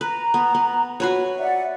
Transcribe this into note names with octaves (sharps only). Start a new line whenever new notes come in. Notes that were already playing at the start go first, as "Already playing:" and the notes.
B4 A#5
B3
B3
F#4 B4 C#5
D5 E5 F#5